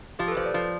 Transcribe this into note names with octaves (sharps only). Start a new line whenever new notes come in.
F3 G4
A4
B4
F3 C5
D5
F3